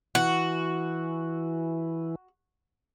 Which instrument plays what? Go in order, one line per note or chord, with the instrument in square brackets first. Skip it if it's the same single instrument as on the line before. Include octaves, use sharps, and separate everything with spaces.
[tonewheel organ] E3 [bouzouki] F#4